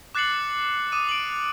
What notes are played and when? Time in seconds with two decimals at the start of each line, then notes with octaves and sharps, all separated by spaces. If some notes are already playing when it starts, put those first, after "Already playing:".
0.15 D6 F#6 A6 C7 C#7 F#7
0.92 D6 D#6 D#7
1.09 D7 F#7